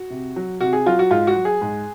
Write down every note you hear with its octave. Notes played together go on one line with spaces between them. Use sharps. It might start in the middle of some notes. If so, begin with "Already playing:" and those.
Already playing: F#4
C3
F#3
C3 F#4
G#4
F#3 F4
F#4
G#2 F4
F#4
F#3
G#4
G#2